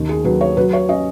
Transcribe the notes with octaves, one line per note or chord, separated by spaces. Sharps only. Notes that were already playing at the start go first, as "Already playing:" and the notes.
Already playing: D#2 D#3
G#4
F#3 B4
C#5
F#3 B4
C#5
C#4 D#5